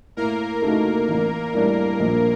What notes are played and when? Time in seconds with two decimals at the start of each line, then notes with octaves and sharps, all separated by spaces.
0.17 A2 A#3 A#4
0.62 A3 D#4 F#4
1.08 A1
1.54 A2 G3 D4
2.00 A#1